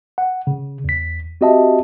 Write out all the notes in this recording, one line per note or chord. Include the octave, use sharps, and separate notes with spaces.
F#5
C#3
E2 B6
C4 F#4 G4 D#5 E5 A5